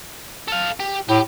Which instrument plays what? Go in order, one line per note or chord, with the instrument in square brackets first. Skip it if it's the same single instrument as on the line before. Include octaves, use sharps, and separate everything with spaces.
[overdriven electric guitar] A4 F5
G4
[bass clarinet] A2 [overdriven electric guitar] G4